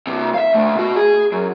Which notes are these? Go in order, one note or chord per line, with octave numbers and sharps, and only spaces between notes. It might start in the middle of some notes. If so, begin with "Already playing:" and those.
G2 C3
E5 F5
D2 A3
B2 F#4
G#4
F#2